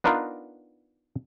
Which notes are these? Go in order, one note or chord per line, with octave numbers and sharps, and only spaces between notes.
B3 D4 D#4 F4 A#4 B4